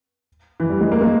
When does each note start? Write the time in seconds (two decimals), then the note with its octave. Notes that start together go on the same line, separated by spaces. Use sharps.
0.60 E3
0.69 G3
0.81 G#3
0.92 A#3
1.01 G#3